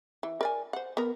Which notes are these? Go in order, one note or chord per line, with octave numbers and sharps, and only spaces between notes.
E3
A#4 D5 G#5
C5 F#5
B3 A#4